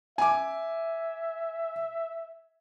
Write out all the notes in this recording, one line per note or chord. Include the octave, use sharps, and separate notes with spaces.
E5 G#5 D6